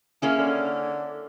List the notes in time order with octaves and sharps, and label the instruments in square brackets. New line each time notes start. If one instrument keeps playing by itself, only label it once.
[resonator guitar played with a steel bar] A#3 C#4 E4 [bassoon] G#4
[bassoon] D3